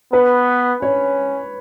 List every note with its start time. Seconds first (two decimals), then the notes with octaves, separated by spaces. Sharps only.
0.13 B3 B4
0.82 C#4 C#5